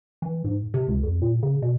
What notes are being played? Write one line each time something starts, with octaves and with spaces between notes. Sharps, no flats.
E3
G#2
C3
C#2
F2
A#2
C#3
B2